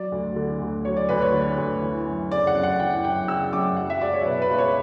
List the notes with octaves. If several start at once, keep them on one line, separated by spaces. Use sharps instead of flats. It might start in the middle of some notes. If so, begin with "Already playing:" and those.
Already playing: F#3 D5
D2
D3
D2
F#3 C#5
D5
D2 B4
C#5
D3
D2
E3
F#2
C#3 D5
F#5
F#2
F#5
E3 G5
F#2 G5
C#3 E6
F#2 D6
F#3 F#5
E5
C#2 D5
C#5
B2 B4
B4
C#2
C#5